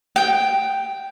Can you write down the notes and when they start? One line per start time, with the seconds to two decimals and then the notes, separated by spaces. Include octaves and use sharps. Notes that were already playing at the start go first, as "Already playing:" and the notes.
0.16 G5